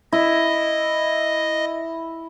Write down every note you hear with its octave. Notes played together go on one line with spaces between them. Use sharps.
E4 D#5